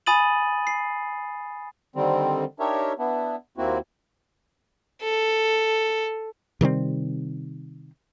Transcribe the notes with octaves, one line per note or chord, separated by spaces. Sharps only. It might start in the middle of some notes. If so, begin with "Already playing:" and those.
G#5 B5 D#6 A6 D#7 F#7
C7
D3 D#3 G3 C4
D4 D#4 G4 A#4 C#5 E5
B3 D4 E4
D#2 A#3 C4 E4 F#4
A4
C3 D#3 G3 C4